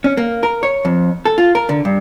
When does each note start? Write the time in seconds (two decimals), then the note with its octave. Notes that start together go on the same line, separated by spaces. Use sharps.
0.04 C#4
0.17 A#3
0.43 A#4
0.63 C#5
0.85 F2
1.25 A4
1.38 F4
1.55 A#4
1.69 D3
1.85 G2